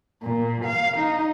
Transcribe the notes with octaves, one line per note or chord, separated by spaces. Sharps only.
A#2
F5
D#4